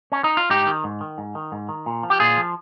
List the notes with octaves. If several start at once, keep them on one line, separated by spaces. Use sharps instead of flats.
C#4
D#4
F4
G#2 D#4 G4
D#3
G#2
D#3
G#2
D#3
G#2
D#3
A#2
F3
G4
A#2 F4 G#4
F3